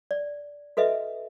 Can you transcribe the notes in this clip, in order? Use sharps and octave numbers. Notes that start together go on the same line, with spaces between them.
D5
F#4 A4 B4 D#5 E5